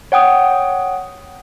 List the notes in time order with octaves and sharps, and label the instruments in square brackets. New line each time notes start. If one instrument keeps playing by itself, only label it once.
[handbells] C#5 F#5 G5 D#6